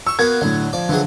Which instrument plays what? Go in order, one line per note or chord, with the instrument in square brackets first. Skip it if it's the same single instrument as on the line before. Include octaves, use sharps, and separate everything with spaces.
[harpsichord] C#6 [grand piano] E6
[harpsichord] A#3 B3 F#4 [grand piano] G#6
[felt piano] A2 D3 [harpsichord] F#3
[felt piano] F3 [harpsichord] D5
[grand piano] D3 [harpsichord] E3 F#3 G#4